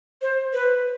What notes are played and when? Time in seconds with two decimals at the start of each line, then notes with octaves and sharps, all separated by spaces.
0.22 C5
0.53 B4